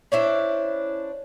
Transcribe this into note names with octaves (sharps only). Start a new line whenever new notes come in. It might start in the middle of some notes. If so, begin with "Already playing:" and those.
C#4 D4 E4 C5